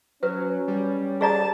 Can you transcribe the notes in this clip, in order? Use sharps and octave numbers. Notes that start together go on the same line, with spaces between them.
F#3 C#4 B4
G3
G#4 D5 A5 A#5